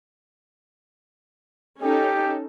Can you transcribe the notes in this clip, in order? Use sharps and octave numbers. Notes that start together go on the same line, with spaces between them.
C#4 D#4 G4 A4